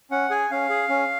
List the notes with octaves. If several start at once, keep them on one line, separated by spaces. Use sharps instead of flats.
C#4 F#5
G#4 G#5
C#4 F5
G#4
C#4